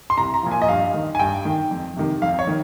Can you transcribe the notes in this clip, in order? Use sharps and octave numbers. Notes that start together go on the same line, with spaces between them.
C6
C2 A#5
A#5
A#2 F3
G#5
D#5
G2 F5
D#3
G#5
G2 G5
D#3
F2
C3 D#3
F2 F5
C#5
D#3